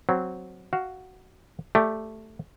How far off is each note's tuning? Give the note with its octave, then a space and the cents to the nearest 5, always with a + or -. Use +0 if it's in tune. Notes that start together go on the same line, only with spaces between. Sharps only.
F#3 +0 C4 -5
F#4 +10 F5 +0
A3 +0 G4 +0 D5 +0